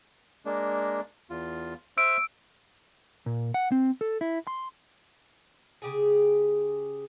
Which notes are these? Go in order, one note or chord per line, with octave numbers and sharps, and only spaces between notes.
G#3 A#3 D4
E2 F4
C5 E5 E6 F6 D7
A#2
F#5
C4
A4
E4
C6
C#3 G4 G#4